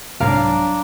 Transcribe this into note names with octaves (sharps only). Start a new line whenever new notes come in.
C2 G#2 F#3 D4 C#5 F5 A#5 D7